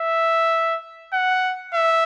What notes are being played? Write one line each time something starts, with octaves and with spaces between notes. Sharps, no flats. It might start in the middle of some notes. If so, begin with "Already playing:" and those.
Already playing: E5
F#5
E5